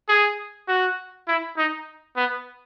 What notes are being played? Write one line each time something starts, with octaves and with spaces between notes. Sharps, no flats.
G#4
F#4
E4
D#4
B3